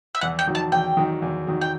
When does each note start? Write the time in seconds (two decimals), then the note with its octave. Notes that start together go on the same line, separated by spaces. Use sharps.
0.15 E5
0.21 E2 F#5
0.39 G5
0.47 D#3 F#3
0.55 A5
0.72 E2 G5
0.97 D#3 F#3
1.22 E2
1.47 D#3 F#3
1.61 G5